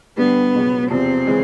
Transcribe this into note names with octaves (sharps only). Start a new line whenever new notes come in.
G2 D3 G3 B3
C#2 B2 F#3
E2 C3 F3 C4
C#3 E3 G#3 C#4